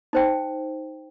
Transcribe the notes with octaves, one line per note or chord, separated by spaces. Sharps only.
D#4 C5 G5